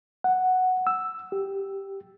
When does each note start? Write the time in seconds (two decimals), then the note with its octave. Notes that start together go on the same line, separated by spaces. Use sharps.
0.24 F#5
0.87 E6
1.32 G4